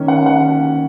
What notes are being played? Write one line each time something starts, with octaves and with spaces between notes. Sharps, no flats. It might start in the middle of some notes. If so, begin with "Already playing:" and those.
Already playing: D#3 A#3 C#4
F#5
F#5